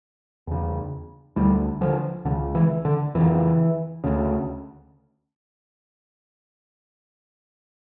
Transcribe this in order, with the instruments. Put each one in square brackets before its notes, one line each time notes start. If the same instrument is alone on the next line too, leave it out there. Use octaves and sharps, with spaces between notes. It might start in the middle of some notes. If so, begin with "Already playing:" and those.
[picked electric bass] E2 C#3
D2 D3 E3 G3
D3 F3
C#2 D3
C#3
E3
D3
F2 C#3 E3
D2 C#3